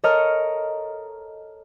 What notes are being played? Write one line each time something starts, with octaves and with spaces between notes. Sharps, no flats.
A4 A#4 C#5 D#5 F6